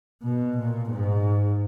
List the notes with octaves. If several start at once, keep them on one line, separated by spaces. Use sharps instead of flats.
B2
A#2
G#2